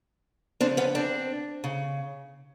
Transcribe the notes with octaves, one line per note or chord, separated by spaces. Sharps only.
C#3 F3 C4 D4
B3 C#4
C4 D4
C#3